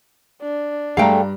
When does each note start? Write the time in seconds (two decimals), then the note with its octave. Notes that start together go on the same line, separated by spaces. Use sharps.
0.42 D4
0.97 G2 G#3 A3 A4 F5 G5 A#5